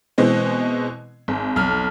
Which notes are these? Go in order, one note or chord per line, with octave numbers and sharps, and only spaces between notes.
B2 E3 G#3 C4
G#1
B1 F2 F6